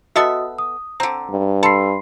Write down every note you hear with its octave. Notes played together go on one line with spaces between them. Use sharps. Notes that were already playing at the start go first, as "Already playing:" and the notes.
B3 F#4 A4 D#5 E5 D#6
D#6
D3 C4 A#5
G2
A4 B5 C6 C7